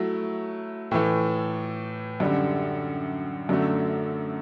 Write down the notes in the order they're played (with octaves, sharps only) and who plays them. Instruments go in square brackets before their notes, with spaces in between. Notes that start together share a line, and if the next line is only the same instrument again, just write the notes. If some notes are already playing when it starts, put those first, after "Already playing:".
Already playing: [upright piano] F#3 A3 E4
A2 E3 A3
F#2 D3 G3
F#2 D3 F#3 A3